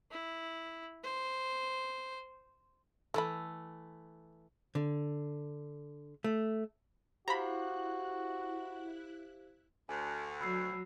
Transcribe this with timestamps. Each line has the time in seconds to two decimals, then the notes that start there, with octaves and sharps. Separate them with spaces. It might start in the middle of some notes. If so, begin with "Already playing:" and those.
0.11 E4
1.03 C5
3.14 E3 A3 A4 B5
4.75 D3
6.24 A3
7.28 E4 F#4 G4 C5 F5 A#5 B5 F#6
9.89 D2 G#5
10.41 F#3 B5 E6 C7